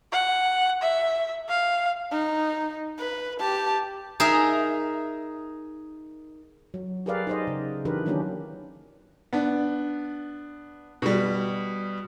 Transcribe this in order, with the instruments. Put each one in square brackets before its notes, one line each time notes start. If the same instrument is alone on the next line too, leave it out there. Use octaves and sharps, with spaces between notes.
[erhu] F#5
E5
F5
[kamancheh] D#4
B4
G4 A5
[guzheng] D#4 G#4 A#4 E5
[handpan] F#3
G4 G#4 A#4 B4 D5 F5
D#4 G4 G#4 C5 D5 D#5
C#3
E3 D4 D#4 G4 A#4 B4
D#3 F#3 A#3 C#4 D4 G4
[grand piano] B3 D4
B2 G3